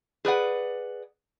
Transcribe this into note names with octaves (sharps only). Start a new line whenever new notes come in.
G#4 B4 D5 F#5